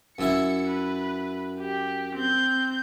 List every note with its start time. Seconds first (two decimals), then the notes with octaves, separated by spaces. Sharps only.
0.18 F#2 E4 E5 C#7
0.68 B4
1.60 G4
2.16 C4 G6